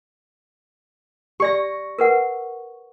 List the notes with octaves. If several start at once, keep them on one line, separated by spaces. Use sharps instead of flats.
G4 D5 C#6 A#6
A#4 B4 F#5